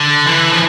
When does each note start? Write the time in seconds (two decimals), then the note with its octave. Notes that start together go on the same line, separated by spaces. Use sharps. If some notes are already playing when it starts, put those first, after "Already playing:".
Already playing: D3
0.26 E3
0.51 F3